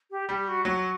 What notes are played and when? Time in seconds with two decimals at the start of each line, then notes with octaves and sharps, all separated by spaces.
0.10 G4
0.29 G3 G4
0.48 F#4
0.65 F#3 F#4